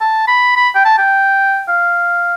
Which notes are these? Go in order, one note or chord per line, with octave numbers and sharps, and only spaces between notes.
A5
B5
B5
G5
A5
G5
F5